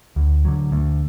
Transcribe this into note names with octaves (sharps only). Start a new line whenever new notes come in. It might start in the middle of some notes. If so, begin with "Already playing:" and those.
D2
D3 F#3
D2